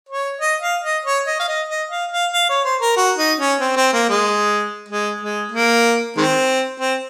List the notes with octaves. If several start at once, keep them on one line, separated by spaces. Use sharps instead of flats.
C#5
D#5
F5
D#5
C#5
D#5
F5
D#5
D#5
F5
F5
F5
C#5
C5
A#4
F#4
D#4
C#4
C4
C4
A#3
G#3
G#3
G#3
A#3
D#3 G#3 C4
C4